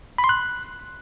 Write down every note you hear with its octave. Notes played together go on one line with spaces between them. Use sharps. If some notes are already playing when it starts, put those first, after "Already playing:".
B5
C6
F#6